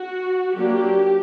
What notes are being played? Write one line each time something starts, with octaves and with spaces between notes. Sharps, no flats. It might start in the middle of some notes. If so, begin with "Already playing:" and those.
Already playing: F#4
F#3 A#3 D4 G4